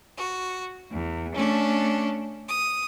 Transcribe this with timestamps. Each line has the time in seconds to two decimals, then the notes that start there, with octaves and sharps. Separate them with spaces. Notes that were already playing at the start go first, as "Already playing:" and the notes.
0.16 F#4
0.91 E2
1.33 A3 C#4 D4
2.48 D#6